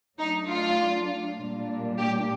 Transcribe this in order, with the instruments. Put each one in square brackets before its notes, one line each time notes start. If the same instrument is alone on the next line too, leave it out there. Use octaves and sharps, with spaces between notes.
[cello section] F#3 A3 D4 [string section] D#4
[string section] F4
[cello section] A#2 G3 A#3 D4
[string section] G4